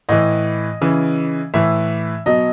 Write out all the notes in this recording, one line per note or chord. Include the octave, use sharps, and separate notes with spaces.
A2 E3 D#5
C#3 E3
A2 E3 E5
B2 F#3 D#5